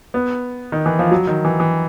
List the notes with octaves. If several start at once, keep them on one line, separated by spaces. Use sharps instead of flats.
B3
D#3
E3
F3
F#3
D#3
E3
E3